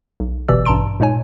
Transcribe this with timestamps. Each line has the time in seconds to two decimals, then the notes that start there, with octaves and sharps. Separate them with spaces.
0.20 B1
0.48 G1 B2 E3 G4 D5 E6
0.65 A1 G2 A5 A#5 C6 D7
1.00 A#2 G#3 D#4 C#5 G#5